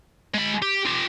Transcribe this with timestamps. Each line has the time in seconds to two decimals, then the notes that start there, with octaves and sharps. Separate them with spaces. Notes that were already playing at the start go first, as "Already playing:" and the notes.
0.34 G#3 B5
0.62 G4
0.86 F4 G4